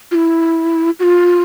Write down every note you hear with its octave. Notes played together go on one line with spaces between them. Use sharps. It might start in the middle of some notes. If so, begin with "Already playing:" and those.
F4
E4
F#4
F4